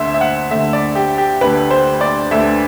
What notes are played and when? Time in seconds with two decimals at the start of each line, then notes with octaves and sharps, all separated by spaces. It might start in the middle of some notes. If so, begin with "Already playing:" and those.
Already playing: D2 D3 A3 C5 E5
0.14 E5
0.21 F#5
0.51 D2 D3 A3 E5
0.73 D5
0.95 G4
1.18 G4
1.41 D2 D3 A3 B4
1.71 C5
2.01 D5
2.31 D2 D3 A3 E5